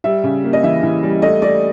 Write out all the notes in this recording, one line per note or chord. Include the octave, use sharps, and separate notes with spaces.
G3 E5
C#3
A#3
D#5
E3 E5
E3
G3
A3 D#5
A3 D5